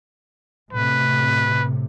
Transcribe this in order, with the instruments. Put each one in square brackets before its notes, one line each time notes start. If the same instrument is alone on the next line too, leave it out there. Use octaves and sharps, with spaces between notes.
[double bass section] A2 C3 [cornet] B4